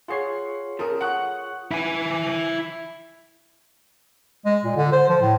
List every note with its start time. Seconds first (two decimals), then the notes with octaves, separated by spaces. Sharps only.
0.08 F4 G#4 C#5 F#5 C#6 C7
0.79 C#3 F3 A4 A#4 D#6
1.01 F#5 C#6 F#6 C#7
1.72 E4 G#5
4.46 G#3
4.64 A#2
4.77 D3
4.92 C5
5.09 F3
5.21 A2